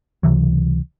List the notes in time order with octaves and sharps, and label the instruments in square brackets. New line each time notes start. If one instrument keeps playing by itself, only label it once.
[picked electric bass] C#2 C3 E3 F#3